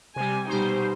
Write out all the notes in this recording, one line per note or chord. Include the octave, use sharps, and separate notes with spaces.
C3 G3 G#5
B2 G3 D#4 C5